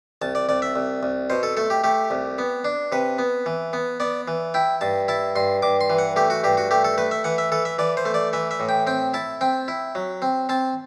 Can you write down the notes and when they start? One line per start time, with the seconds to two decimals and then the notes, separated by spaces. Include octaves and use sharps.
0.22 C2 A5
0.35 D5
0.49 C2 D5
0.62 E5
0.76 C2
1.03 C2
1.30 B2 C5
1.43 A4
1.57 A3 A4
1.70 G4
1.84 A3 G4
2.11 C2
2.38 B3
2.65 D4
2.92 C3 B4
3.19 B3
3.46 E3
3.73 B3
4.00 B3 D5
4.28 E3
4.54 E4 G5
4.81 G2 A5
5.08 E4 A5
5.36 G2 C6
5.62 G2 D6
5.81 C6
5.90 E3
5.98 F#5
6.16 A3 G4
6.30 F#4
6.44 G2 G4
6.57 F#4
6.71 A3 G4
6.85 A4
6.98 A3 B4
7.11 E5
7.24 E3 F#5
7.38 E5
7.52 E3 A4
7.65 E5
7.79 E3 D5
7.97 C5
8.05 A3
8.14 D5
8.33 E3 E5
8.51 E5
8.60 A2
8.69 G5
8.87 C4 G5
9.14 E4 A5
9.41 C4 G5
9.68 E4
9.95 F#3
10.22 C4
10.49 C4 A5